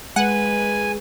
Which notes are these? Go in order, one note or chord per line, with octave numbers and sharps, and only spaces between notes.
G#3 B4 F#5 G#5